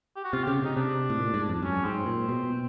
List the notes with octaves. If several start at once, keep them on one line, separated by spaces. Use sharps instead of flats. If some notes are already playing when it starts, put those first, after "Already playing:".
G4
F#4
C3 F4
C#3 G4
C3 D#4
C3 D4
A2
A#2
G#2
F2
F#2 C#4
G#2 C4
A#2
B2